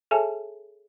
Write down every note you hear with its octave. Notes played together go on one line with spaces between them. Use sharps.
G#4 A4 C#5 E5 G#5 A5